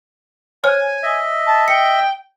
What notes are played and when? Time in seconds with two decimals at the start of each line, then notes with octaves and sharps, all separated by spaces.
0.64 C5 C#5 G#5 F6
1.03 D#5 E5
1.46 A5
1.68 G5 C#7